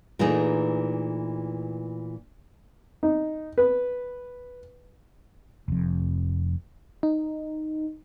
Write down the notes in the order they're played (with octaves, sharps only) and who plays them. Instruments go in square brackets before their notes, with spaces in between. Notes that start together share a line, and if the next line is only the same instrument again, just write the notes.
[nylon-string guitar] A#2 E3 A3 D#4 G#4
[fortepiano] D#4
B4
[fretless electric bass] F1 F2
[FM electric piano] D#4